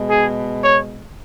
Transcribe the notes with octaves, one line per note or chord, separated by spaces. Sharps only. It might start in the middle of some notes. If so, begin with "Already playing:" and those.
Already playing: B2 G#3
G#4
C#5